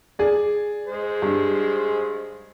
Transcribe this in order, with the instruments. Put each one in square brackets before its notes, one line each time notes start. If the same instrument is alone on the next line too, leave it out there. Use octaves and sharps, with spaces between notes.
[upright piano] G#4 D5
[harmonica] G#3 C5
[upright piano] G2